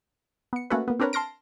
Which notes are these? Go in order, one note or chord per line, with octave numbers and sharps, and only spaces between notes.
B3 C#7
A3 A#3 C#4 F#4 A4 B4
A#3 B3
C4 D4 A#4 B4 C#5
A5 C6 F6 A#6 D7